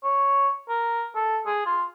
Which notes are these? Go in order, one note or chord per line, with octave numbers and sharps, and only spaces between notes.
C#5
A#4
A4
G#4
F4